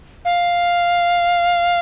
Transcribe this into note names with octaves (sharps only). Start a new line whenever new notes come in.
F5